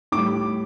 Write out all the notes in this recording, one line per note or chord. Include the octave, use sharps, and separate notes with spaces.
A2 D6
G3